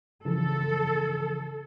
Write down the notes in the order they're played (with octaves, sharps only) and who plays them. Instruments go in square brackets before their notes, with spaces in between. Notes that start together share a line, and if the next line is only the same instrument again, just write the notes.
[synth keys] C#3 E3 F3 [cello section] A4